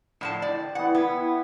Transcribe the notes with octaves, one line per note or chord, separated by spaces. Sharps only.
A2 D3 F3 A5
G4 C5 D5 D#5
E3 B3 F#5
B3 E4